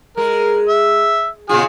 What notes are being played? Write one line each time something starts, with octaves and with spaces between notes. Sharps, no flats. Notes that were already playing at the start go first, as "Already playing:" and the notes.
G#3 A#4
E5
A#2 C#3 F4 G#4